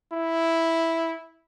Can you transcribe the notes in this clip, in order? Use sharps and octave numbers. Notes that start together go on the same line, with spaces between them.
E4